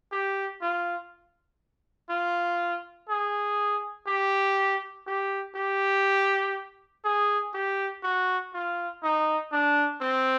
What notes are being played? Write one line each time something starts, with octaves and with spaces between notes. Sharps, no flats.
G4
F4
F4
G#4
G4
G4
G4
G#4
G4
F#4
F4
D#4
D4
C4